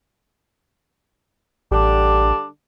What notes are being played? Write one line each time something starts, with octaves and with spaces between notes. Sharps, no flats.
A1 D3 G3 D4